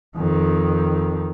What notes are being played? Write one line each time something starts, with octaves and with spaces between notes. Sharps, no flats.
F2 D#3